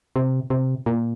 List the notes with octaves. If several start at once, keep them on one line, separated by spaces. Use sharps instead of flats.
C3
C3
A#2